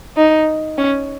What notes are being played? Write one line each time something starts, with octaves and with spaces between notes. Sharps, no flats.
D#4
C#4